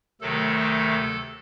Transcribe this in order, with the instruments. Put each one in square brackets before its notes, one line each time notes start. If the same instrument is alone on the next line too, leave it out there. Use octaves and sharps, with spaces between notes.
[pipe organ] D2 C3 D#3 F#3 A3 A4